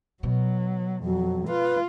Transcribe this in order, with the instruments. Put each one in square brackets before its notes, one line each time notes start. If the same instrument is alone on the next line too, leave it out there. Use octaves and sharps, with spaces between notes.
[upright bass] B2 [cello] F#3
[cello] F2 [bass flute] F#3
[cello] F4 [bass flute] B4